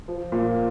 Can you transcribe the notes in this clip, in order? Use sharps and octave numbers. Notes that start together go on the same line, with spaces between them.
F3
A#2